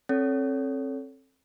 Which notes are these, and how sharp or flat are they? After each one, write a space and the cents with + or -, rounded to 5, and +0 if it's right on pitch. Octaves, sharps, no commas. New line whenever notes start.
C4 +35 A4 +0 C#5 +30